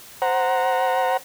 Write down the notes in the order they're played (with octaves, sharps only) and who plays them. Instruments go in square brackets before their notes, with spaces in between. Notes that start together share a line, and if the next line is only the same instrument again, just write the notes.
[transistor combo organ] C5 F#5 A#5